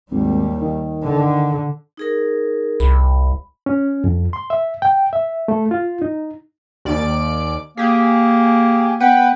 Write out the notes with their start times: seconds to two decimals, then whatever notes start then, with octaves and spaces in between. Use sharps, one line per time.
0.11 G#1 D#2 G3
0.61 D#3
1.03 D3
1.97 D#4 G#4 A#4
2.80 C2 B5
3.66 C#4
4.04 F2
4.33 C6
4.50 E5
4.82 G5
5.13 E5
5.48 A3
5.71 F4
6.02 D#4
6.85 D#2 D5 D7
7.77 A#3 G4 G#4
9.00 B3 B4 F#5 G5